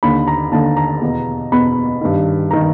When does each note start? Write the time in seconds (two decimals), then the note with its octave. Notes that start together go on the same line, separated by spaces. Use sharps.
0.03 D#2 D3 B5
0.28 A#5
0.52 D#2 D3 A5
0.77 A#5
1.01 E2 B2
1.52 E2 B2 B5
2.01 G2 D#3
2.51 D#3 A#5